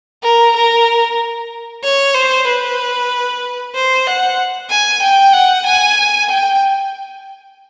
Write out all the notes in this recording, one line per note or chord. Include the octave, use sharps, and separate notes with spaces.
A#4
A#4
C#5
C5
B4
C5
F#5
G#5
G5
F#5
G#5
G5